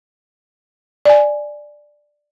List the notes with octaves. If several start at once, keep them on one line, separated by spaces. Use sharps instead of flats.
D5 G#5